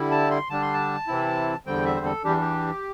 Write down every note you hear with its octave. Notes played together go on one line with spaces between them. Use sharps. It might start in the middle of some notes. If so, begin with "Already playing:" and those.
Already playing: D3 G3 E4
A5
C6
D3 G3 D4 A5
C6
A5
C3 E3 C4 E4
E2 D3 G3 C4 G5
E5
C5
A4
E2 E3 G3 D4 G4
G4